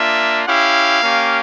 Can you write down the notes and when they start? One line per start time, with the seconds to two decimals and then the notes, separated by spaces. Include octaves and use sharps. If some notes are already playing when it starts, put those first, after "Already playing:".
Already playing: A#3 D4 F4 E5
0.46 C#4 E4 G4 F5
1.01 A#3 C#4 G4